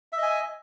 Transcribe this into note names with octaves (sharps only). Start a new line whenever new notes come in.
D#5 E5 G#5